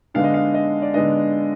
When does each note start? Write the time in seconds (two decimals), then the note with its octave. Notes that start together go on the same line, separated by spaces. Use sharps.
0.14 D3 G#3 B3 D4 F5
0.24 D#5
0.34 F5
0.54 D#5
0.82 D5
0.94 D3 G#3 B3 D4 D#5